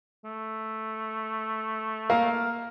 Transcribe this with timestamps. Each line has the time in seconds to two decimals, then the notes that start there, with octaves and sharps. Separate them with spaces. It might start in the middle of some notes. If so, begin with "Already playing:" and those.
0.25 A3
2.10 A#3 F5